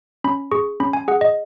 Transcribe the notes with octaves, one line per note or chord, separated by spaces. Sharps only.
C#4 B5
G#4 C#6
C#4 B5
G#5
G#4 F#5
D#5